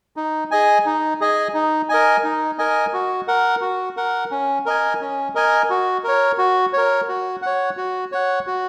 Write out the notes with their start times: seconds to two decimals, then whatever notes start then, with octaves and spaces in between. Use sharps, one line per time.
0.16 D#4
0.51 G#4 D#5 G#5
0.86 D#4
1.21 G#4 D#5 G#5
1.54 D#4
1.89 A#4 D#5 G#5
2.24 D#4
2.58 A#4 D#5 G#5
2.93 F#4
3.28 A#4 F#5
3.61 F#4
3.97 A#4 F#5
4.31 C#4
4.66 A#4 D#5 G#5
5.01 C#4
5.35 A#4 D#5 G#5
5.70 F#4
6.04 A#4 C#5
6.38 F#4
6.73 A#4 C#5
7.08 F#4
7.42 C#5 F#5
7.77 F#4
8.12 C#5 F#5
8.47 F#4